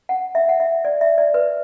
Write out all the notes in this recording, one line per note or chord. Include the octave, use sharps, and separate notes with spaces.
F#5
E5
F#5
E5
D5
E5
D5
B4